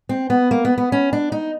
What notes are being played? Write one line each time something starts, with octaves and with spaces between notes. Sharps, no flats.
C4
B3
A#3
B3
B3
C#4
D4
D#4